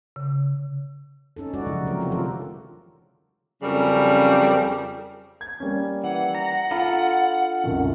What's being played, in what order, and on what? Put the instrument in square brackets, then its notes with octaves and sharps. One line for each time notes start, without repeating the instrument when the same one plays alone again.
[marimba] C#3
[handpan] C#4 D#4 A4
G#3 D#4 F#4 D5
C#3 F3 F#3 E4
C3 F#3 A3 G4 A#4
C3 F3 F#3 F4 F#4 A#4
D3 E3 F4 G4 A4 A#4
[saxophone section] F2 C#3 F#3 G3 C#4 A#4
[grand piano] G#6
G3 A#3 C#4
[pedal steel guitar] E3 [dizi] F#5
[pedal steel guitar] A#5
[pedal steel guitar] D4 F4 A4 [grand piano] F5 A#5 B5
[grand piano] C2 F#2 D#3